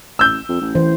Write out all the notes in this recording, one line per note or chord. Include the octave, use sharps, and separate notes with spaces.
A1 E6 G6
F2
A1
E3 C5